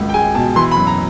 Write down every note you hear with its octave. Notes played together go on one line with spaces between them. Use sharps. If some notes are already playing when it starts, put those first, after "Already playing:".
Already playing: G#1 C#2
G5
G#3 G#5
B2 A5
E3 C6
B5
F#2
A#5